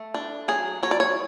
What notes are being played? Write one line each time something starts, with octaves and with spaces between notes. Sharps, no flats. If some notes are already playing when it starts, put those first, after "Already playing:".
Already playing: A3
D4
F#3 G#4
F#3 C#5
D5
C#5